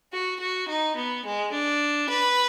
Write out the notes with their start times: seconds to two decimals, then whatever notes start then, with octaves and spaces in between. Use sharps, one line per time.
0.13 F#4
0.40 F#4
0.69 D#4
0.96 B3
1.25 G#3
1.52 D4
2.09 B4